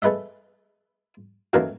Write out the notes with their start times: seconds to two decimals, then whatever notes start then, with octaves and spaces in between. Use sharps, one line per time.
0.02 A3 G#4 B4 D#5 E5
1.53 F#2 D#3 E3 F#3 A3 A#3